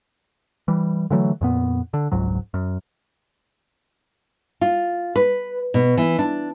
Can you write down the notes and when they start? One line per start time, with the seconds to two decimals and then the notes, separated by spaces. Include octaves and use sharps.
0.68 E3 G3
1.11 D3 E3 F#3 A3
1.41 F2 A#2 B3
1.94 D3
2.12 F1 C#2 G#2 F#3
2.54 F#2
4.61 F4
5.16 B4
5.74 B2
5.97 E3
6.19 D4